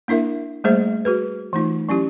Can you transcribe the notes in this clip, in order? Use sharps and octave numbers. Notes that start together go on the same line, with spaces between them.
A#3 D4 E4 A#4 E5
G3 A3 A#3 G#4 C5 E5
F#4 G#4 B4
E3 A3 D#4 F4
F#3 C#4 E4 G4